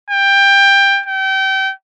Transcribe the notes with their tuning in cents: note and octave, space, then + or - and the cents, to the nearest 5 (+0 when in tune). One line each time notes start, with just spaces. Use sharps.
G5 +15
G5 -30